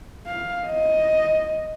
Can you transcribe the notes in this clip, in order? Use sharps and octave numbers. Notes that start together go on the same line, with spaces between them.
F5
D#5